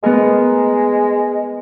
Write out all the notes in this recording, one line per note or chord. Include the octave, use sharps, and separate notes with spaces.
G#3 B3 A#4